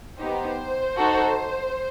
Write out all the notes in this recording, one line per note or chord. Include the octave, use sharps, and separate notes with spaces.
B3 D#4 G4 C5
D#4 F#4 A4